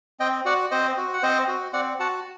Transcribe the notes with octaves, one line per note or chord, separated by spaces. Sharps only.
C4 D#5 G5
F#4 D5 F#5
C4 C5 D#5
F#4
F#5
C4 C5 D#5
F#4
C4 D5 F#5
F#4 F#5 A5